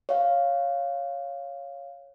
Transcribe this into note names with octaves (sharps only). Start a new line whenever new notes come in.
C#5 F5